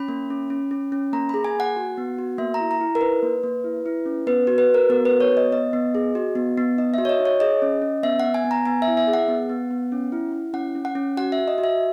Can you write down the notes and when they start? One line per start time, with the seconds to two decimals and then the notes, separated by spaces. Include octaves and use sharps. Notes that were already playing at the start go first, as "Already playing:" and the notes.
Already playing: C#4 B5
0.08 A#3
0.30 C#4
0.50 C#4
0.71 C#4
0.92 C#4
1.13 A#3 A#5
1.29 G#4 B5
1.44 G#5
1.55 A#3 F#5
1.76 F#4
1.98 B3
2.18 F#4
2.38 A#3 E5
2.54 A#5
2.60 E4
2.71 A#5
2.80 E4
2.95 A#4
3.01 D#4 B4
3.23 A#3
3.43 A#3
3.64 E4
3.86 E4
4.06 C#4
4.27 B3 B4
4.47 F#4
4.58 B4
4.69 F#4
4.74 A#4
4.89 B3 A#4
5.05 B4
5.11 F#4
5.20 C#5
5.32 B3
5.37 D#5
5.52 B3 D#5
5.73 B3
5.95 G#4
6.15 F#4
6.35 B3
6.57 B3
6.78 D#4 D#5
6.94 F#4 E5
7.05 C#5
7.09 D#5
7.19 D#4
7.25 C#5
7.40 G#4 D#5
7.62 C#4
7.82 C#4
8.03 B3 E5
8.20 B3 F#5
8.34 G#5
8.44 B3
8.51 A#5
8.66 B3 G#5
8.82 E5
8.87 E4
8.97 E5
9.07 G#4
9.14 F#5
9.28 B3
9.49 B3
9.71 B3
9.92 C#4
10.12 E4
10.33 E4
10.54 C#4 F#5
10.75 C#4
10.85 F#5
10.95 C#4
11.17 F#4 F#5
11.32 E5
11.38 F#4
11.48 D#5
11.58 F#4
11.64 E5